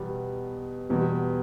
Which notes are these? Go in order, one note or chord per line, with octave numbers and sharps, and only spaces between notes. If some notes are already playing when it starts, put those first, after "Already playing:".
Already playing: E2 B2 G3 B3
E2 B2 G3